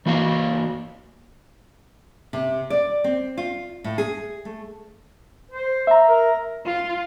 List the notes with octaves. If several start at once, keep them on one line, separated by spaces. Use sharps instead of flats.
E3 A#3 F#4 F5
C3
D5
C4
F4
A2
G#4
A3
C5
E5 A#5
A#4
F4